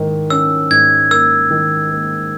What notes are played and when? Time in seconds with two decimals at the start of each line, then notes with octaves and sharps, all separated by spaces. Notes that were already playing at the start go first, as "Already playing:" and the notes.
Already playing: G#2 D#3
0.30 C#4 E6
0.71 G#2 G#6
1.11 A#3 E6
1.51 D#3
1.91 A#3